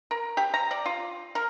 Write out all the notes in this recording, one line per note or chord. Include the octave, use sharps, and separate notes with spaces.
A#4
G4
A#5
D5
F4
A#4